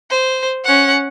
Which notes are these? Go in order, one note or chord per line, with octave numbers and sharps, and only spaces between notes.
C5
C#4 F#5